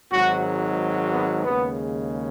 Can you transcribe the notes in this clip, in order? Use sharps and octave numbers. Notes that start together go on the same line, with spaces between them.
G#1 G#2 F#3 F#4
B3
D#2 C#3 G#3 B3